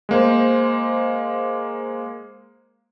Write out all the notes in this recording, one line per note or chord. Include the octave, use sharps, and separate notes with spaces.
G#3 A#3 C5